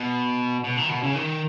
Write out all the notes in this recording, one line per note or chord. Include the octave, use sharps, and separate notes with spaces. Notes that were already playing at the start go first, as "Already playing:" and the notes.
Already playing: B2
B2
D#3
B2
C#3
D#3